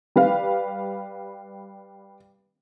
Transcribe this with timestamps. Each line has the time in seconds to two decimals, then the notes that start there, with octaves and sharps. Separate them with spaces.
0.16 G3 B4 F5